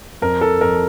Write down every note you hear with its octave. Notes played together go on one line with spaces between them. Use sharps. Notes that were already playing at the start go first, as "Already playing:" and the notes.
F2 A#4
A4
F2 A#4